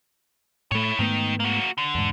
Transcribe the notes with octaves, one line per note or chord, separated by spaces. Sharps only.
A2 A3 E4 C#5
G#2 D#3 A3 B3
A#3 F#4
D3
E2 G#2